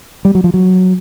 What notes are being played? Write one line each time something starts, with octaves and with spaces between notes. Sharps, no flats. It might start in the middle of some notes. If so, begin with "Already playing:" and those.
G3
F#3
F3
F#3